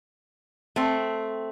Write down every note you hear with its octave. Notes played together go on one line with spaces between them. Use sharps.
A3 C4